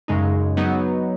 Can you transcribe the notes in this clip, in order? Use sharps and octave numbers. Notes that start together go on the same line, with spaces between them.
F#2 C#3 G#3 D#4
F#3 B3 D#4